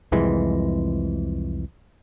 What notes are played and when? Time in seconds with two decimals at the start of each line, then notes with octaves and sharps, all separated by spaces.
0.12 C2 F2 E3 G#3